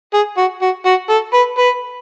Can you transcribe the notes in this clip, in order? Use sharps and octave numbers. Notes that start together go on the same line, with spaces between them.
G#4
F#4
F#4
F#4
A4
B4
B4